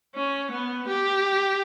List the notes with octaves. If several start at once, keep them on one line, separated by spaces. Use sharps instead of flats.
C#4
B3
G4